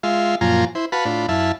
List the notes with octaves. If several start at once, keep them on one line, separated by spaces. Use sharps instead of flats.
G#3 F4 E5 F5
F#2 A#2 F3 F4 G#5 A#5
E4 C5
F#4 B4 F5 A5 B5
A2 D4 F4 B5
F#2 E4 E5 F5 A5